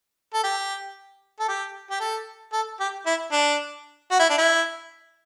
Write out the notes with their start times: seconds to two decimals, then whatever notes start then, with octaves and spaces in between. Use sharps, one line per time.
0.34 A4
0.44 G4
1.40 A4
1.48 G4
1.91 G4
2.00 A4
2.53 A4
2.80 G4
3.06 E4
3.32 D4
4.12 F#4
4.20 E4
4.30 D4
4.38 E4